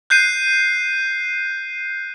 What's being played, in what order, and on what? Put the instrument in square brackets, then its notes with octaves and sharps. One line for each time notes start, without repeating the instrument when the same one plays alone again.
[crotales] F#6 G6 C7 D#7